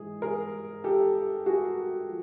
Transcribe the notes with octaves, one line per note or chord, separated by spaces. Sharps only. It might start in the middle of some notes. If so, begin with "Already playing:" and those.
Already playing: G#2 E3 G#3 G#4
G#4 A#4
G4 A4
F#4 G#4
F3